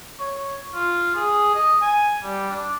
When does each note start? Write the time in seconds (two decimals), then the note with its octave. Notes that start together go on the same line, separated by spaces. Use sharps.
0.19 C#5
0.74 F4
1.16 G#4
1.55 D#5
1.81 G#5
2.23 G3
2.50 D4